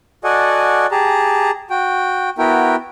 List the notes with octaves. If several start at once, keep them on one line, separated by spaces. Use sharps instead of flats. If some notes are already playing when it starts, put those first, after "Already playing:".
F#4 A4 D5 D#5 F#5 G#5
G4 G#4 A5 A#5
F#4 G5
B3 E4 F#4 A#4 G5